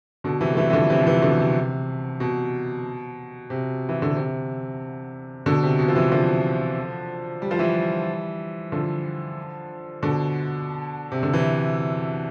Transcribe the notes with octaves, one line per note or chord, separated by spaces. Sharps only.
B2 D3
C3 E3
A3
E3 G3
E3
D3 F3
C3 E3
F3
C3 E3
B2 D3
C3
B2
C3
E3
D3
C3
B2 D3
C3
B2
F3
C3 E3
D3 F3
G3
F3
E3 G3
D3 F3
B2 D3
C3
D3
C3 E3